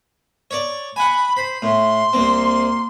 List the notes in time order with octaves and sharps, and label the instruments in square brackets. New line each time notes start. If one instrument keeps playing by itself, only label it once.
[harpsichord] C#5 D5
[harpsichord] F#5 G#5 [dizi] B5
[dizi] C5 [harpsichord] B5
[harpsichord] A2 [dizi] C6
[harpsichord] C2 C4 [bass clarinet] A#3